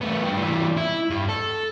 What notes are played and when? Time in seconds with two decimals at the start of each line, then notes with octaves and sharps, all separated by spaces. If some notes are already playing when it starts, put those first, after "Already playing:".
0.01 A3 B3
0.24 G2 G4
0.37 E3 G3
0.77 E4
1.10 G2
1.29 A4